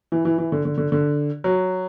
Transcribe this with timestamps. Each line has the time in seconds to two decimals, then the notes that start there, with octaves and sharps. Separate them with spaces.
0.12 E3
0.25 E3
0.38 E3
0.52 D3
0.65 D3
0.78 D3
0.92 D3
1.44 F#3